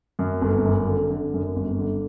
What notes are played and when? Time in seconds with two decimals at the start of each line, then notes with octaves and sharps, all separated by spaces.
0.19 F#2
0.41 G1
0.65 F#2
0.87 D3
1.10 D3
1.34 F#2
1.56 G1
1.79 D3